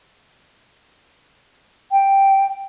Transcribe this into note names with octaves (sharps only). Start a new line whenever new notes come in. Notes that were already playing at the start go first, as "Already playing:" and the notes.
G5